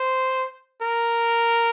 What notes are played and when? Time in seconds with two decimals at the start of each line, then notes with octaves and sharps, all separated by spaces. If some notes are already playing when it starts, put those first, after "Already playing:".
Already playing: C5
0.82 A#4